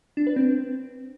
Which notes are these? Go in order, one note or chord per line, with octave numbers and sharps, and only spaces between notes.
D4
B4
C4